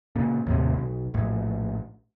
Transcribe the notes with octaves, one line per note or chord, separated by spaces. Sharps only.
A#2 C#3
D#2 A2 C3
B1
A#1 A2